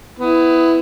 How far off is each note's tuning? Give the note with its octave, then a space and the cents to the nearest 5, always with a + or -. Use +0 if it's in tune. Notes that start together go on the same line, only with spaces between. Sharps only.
B3 +20 E4 +0